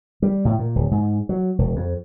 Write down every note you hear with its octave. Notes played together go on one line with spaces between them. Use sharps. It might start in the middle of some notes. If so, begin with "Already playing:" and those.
G3
A2
A#2
D1
G#2
F#3
E1
F2